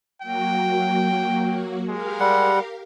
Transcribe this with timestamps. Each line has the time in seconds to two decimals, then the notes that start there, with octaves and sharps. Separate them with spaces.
0.21 F#3 A#3 F#4 G5
1.88 G#3 G4 A#4 F5
2.20 G3 F#5